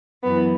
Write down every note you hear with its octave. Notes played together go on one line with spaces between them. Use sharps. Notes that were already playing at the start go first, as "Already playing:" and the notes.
F#2 E3 B3